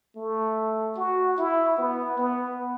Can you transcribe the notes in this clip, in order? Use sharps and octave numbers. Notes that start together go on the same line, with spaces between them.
A3
F#4
E4
B3
B3